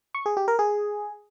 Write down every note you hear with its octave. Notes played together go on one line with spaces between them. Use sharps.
C#6
G#4
G4
A#4
G#4